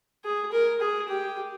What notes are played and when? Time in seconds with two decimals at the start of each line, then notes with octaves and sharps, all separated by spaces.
0.25 G#4
0.52 A#4
0.81 G#4
1.08 G4